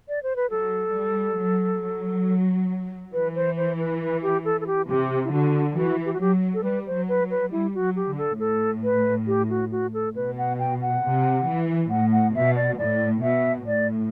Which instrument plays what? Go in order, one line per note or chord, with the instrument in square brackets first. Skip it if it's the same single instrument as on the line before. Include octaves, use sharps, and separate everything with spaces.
[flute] D5
C5
B4
[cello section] F#3 [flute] A4
[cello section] G3
F#3
F#3
[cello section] E3 [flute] B4
[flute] C5
C5
B4
B4
G4
A4
A4
G4
[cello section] C3 [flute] G4
[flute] E4
[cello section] D3 [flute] F#4
[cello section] E3 [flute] F#4
[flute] G4
F#4
[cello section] F#3 [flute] G4
[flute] A4
[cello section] G3 [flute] B4
[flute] C5
[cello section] F#3
[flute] B4
[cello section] F#3
[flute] B4
[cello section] G3 [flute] E4
[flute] F#4
[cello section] F#3
[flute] G4
[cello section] D3
[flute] A4
[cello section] A2 [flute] A4
[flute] B4
G4
F#4
F#4
A4
[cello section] B2 [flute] B4
[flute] F#5
G5
F#5
[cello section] C3
E3
[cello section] A2 [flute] F#5
[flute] F#5
[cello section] B2 [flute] E5
[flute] D5
[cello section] A2 [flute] D5
[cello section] B2 [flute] E5
[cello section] A2 [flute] D5